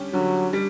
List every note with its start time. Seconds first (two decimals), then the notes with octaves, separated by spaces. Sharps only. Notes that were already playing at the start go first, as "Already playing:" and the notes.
Already playing: D3 G3 C#4 G4
0.13 D3 F#3
0.53 G3